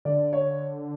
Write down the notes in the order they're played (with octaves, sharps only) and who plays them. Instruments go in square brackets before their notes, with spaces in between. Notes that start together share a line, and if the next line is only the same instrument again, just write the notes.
[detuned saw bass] D3 [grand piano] D5
[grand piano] C#5